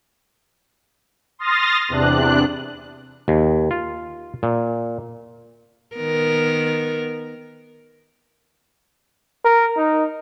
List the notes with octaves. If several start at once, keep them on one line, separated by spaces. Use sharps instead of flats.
C6 D#6 F6 A6 A#6
E2 C3 D4 F#6
D#2
F4
A#2
D#3 B3 A#4
A#4
D#4